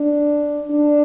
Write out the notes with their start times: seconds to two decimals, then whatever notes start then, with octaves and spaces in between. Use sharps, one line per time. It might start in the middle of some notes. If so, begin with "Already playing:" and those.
Already playing: D4
0.71 D4